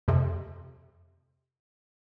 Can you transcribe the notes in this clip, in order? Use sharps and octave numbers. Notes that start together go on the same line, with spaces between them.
F2 C3